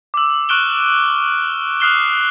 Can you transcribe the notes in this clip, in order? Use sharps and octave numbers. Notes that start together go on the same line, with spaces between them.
D6 E6
C#6 F6 F#6 D7 E7 G7
D#6 F6 F#6 C7 E7 G7